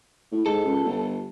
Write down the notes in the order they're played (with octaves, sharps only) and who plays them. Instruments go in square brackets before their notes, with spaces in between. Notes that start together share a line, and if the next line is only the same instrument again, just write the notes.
[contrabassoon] A2
[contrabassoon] G#2 [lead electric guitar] A4
[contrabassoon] C#2
G1